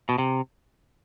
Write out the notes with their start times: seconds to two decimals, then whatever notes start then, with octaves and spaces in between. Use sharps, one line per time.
0.09 B2
0.18 C3